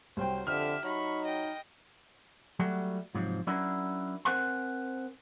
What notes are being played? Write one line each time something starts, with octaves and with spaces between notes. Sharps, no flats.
C2 F#3 C5 G5
F2 D3 G4 E5 F6
F#3 D#4 B5 C#6
D#5 G5
F#3 G3 A3 F#4
G#2 C3 F3 F#3
F#3 C#4 D4 E4 F#4 A#4
C4 A#4 C5 F#5 G#5 C6